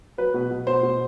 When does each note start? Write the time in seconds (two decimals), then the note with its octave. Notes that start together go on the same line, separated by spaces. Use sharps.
0.18 F#3 B4
0.34 B2
0.50 B2
0.67 B2 C5
0.83 B2